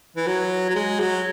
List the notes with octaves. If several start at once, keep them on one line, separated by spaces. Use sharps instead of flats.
E3
F#3
F#3
G#3
F#3